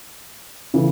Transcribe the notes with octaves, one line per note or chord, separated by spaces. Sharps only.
C#3 E3 A3